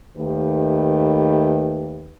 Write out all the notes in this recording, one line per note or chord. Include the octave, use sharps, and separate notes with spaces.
D#2 D#3 A3 G4 B4